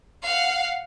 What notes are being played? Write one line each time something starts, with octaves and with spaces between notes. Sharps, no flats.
F5 F#5